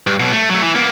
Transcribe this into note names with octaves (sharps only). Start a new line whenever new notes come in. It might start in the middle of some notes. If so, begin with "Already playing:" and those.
G2
B1 B2
A3
F#3 A3
E3
A#3 B3